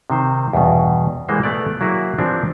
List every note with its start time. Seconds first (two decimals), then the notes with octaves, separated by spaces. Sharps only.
0.10 C3 D#3 C5
0.53 E2 G2 B2
1.28 E3 G3 G#3 A#3 C5
1.43 A3 B3 D5
1.81 F#3 A#3 E4 G#4
2.18 E3 F3 G3 A#3 C4 D4